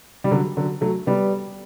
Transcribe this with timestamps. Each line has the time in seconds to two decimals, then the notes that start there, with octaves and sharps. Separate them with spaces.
0.24 G3
0.31 D3 F#3
0.57 D3 F#3
0.81 F#3 A3
1.07 G3 B3